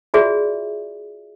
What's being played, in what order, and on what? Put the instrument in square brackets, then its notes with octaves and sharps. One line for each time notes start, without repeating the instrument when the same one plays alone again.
[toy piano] F4 F#4 G#4 D5 E5